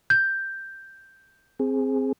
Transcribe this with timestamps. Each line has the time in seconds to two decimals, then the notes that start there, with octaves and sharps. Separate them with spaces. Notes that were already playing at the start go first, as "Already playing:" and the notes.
0.10 G6
1.59 C4 G#4